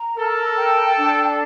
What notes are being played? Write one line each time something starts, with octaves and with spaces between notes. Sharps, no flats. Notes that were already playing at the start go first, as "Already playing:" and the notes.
Already playing: A#5
A4 A#4
G5
D4